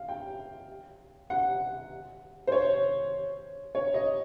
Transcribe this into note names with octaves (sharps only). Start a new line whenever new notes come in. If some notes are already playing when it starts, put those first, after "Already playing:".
Already playing: F5
G5
F#5
C5
C#5
C#5
D#5